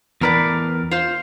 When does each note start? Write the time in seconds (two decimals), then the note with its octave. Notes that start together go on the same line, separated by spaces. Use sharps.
0.21 E2 A2 A#4 B4 D5
0.91 F4 C5